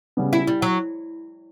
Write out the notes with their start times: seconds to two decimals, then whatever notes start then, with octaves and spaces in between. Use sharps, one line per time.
0.17 C#3 G3 B3
0.33 E4
0.47 G3
0.62 F#3